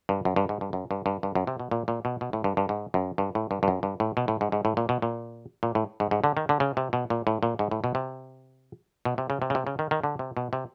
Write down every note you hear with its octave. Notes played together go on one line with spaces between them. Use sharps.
G2
F#2
G2
G#2
G2
F#2
G2
G2
G2
F#2
C3
B2
A#2
A#2
B2
B2
A2
G2
G2
G#2
F#2
G2
A2
G2
G2
F#2
G2
A2
B2
A2
G#2
G#2
A2
A#2
B2
A#2
A#2
A2
G#2
G#2
D3
D#3
D3
C#3
C3
B2
A#2
A2
A#2
G#2
A2
B2
C3
B2
C3
C#3
C3
C#3
C3
C#3
D#3
D#3
D3
C3
B2
C3